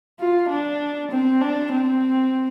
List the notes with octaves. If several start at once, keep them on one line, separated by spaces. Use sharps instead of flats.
F4
D4
C4
D4
C4